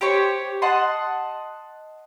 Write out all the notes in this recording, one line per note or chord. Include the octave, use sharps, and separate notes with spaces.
G4 C5 C#5 C#6
D#5 F#5 A5 C6